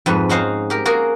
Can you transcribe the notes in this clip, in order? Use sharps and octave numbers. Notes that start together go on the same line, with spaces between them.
F2 G#2 B4
C#4 D#4 F#4 C5 F5
G4 A#4
A#3 F#4 G#4 A#4